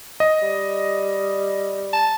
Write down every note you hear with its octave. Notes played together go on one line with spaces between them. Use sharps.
D#5
G3
A5